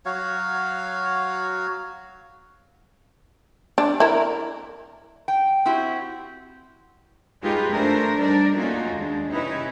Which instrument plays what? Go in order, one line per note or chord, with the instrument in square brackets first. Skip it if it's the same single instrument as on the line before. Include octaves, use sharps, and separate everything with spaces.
[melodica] F#3 F#4 C#5 F5
[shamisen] D4
E4 A#4
[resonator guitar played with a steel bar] G5
C4 E4 F#4 G4
[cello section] G#3 D#4 F4 G4 G#4 B4
A3 D4 A#4 C5
G3 D4 D#4 A#4 D5
A3 A#3 C#4 D#4 F4 F#4
D#2 G#3 D4
C3 C#4 D#4 E4 B4